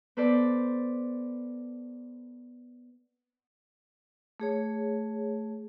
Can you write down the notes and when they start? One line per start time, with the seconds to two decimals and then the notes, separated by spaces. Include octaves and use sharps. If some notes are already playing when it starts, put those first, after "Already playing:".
0.17 B3 A4 B4 C5 D5
4.40 A3 G#4 C#5